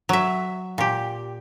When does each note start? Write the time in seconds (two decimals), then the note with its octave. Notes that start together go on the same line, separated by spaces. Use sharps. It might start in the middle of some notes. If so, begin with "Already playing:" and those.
0.09 F#3 E5
0.78 A#2 G4